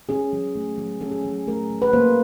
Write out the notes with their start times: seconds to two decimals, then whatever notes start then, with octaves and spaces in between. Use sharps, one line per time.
0.09 C#4 G#4
0.33 F#3
0.55 A3
0.78 F#3
1.01 C#4 A4
1.11 G#4
1.22 F#3 A4
1.47 A3 A#4
1.70 F#3
1.82 B4
1.93 A#3 C5